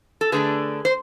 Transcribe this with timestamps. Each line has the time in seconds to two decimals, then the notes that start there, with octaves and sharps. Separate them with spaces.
0.21 A4
0.32 D3 A3 D4 G#4 B4
0.85 C5